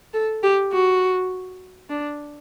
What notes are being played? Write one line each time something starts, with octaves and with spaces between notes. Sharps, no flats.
A4
G4
F#4
D4